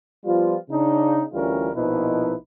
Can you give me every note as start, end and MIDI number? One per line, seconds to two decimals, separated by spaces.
0.25 0.56 53
0.25 0.56 55
0.25 0.56 59
0.25 0.56 65
0.70 1.21 49
0.70 1.21 62
0.70 1.21 63
1.33 1.70 38
1.33 1.70 52
1.33 1.70 55
1.33 1.70 61
1.33 1.70 65
1.33 1.70 70
1.74 2.33 34
1.74 2.33 47
1.74 2.33 53
1.74 2.33 63
1.74 2.33 64
1.74 2.33 71